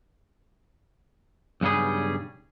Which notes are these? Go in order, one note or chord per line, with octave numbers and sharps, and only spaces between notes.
B1 G2 C#3 G3 G#4